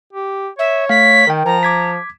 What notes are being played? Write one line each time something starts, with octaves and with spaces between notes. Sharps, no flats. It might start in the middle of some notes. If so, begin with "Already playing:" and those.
G4
C#5 E5
A3 F5 B6
D#3 A#4 G5
F3 A#5
D6 G#6 B6